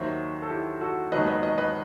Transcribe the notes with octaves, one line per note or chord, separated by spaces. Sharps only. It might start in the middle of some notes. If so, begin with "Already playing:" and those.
Already playing: D#2 D#3 F#3 C5 E5
A4
E4 G4
F#4 A4
E1 D#2 D#3 F#3 B4 D#5
B4 D#5
B4 D#5
B4 D#5